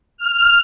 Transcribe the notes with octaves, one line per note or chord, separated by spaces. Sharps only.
F6